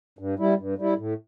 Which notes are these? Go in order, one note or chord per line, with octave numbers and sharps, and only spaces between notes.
G2
G3 E4
G2
G3 E4
A2